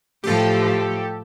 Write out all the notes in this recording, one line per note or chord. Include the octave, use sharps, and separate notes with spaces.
A2 F3 G4 A4